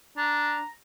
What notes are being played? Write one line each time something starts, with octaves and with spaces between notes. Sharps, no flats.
D4 A#5